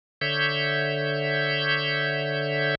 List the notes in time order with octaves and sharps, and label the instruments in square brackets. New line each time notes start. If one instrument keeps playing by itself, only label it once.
[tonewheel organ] D3 C#5 E5 G6